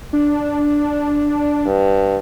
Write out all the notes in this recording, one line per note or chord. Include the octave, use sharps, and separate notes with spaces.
D4
G2